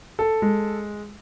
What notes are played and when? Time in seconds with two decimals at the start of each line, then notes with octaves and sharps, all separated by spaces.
0.19 A4
0.42 G#3